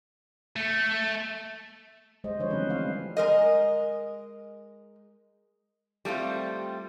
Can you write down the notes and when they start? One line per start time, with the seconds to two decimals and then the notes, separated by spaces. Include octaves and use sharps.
0.56 A3
2.24 G3 G#3 G#4 C5 D#5
2.39 D3 F3 G3 D4 C5 C#5
2.50 E3 F#3 G#3 C4 C#4 B4
2.69 G3 A3 C4 F5
3.17 G#3 A#4 D#5
6.05 G3 A3 C4 F4